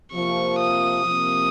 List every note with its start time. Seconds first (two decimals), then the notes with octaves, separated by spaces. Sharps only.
0.12 C3 F3 A#3 C#6
0.59 D#6
1.04 C3 F3 A#3